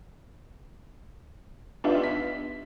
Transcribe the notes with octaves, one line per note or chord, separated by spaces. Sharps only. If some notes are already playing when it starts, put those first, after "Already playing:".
B3 D4 D#4 F4 G4 E5
B6